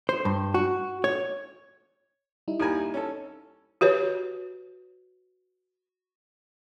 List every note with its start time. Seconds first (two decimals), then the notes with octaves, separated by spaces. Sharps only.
0.09 C5
0.25 G2
0.54 F#4
1.04 C#5
2.48 G3 D#4 E4
2.60 D#2 G4 A#4 G#5 B5
2.94 C#4 A4
3.81 F#4 G4 B4 C#5